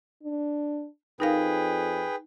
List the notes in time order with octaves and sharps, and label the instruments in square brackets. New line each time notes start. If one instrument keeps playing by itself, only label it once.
[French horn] D4
[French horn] F2 [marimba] D#4 A#4 F5 [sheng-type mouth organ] G#4 B4 G5